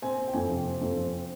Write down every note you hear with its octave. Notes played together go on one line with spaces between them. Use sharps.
C4 G#5
C4
G5
F2 G#5
C3
C4
F2
C4
C4